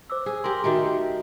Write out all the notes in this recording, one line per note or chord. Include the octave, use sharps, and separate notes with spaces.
C5 D6 E6
G#4
G4 A#4 C6
D#3 A3 F#4 G4 A4